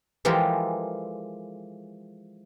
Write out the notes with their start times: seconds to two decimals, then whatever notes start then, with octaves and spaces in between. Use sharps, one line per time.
0.25 E3 F3 G#3 G4 A4 A#4